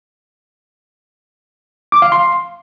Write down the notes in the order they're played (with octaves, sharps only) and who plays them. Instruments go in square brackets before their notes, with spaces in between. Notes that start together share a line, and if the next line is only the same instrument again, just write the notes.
[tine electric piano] D6
F5
C6